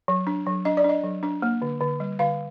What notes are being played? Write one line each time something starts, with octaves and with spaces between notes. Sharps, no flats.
F#3
D4
F#3
D4 D#5
D5
D4 D#5
F#3
D4
A#3
D3
D3
G3
D3 F5